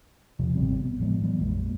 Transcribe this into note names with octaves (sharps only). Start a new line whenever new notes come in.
E2 C3 F3
G#1 B2 G3 C4
B3
A2 F3 G#3 B3
E3 F#3 B3
A#1 F2 G#3 A#3